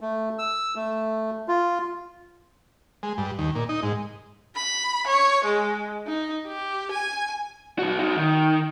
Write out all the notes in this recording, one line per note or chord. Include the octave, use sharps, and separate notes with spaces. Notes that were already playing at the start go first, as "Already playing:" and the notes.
A3
E6
A3
F4
G#3
G2
D#2
A#2
D#4
G#2
B5
C#5
G#3
D#4
G4
G#5
B1 F#4
D#4 F#4
D#3